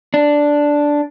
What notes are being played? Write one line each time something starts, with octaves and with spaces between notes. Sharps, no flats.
D4